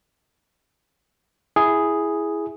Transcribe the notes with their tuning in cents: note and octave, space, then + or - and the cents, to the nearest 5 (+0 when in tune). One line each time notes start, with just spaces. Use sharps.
E4 +0 G#4 +0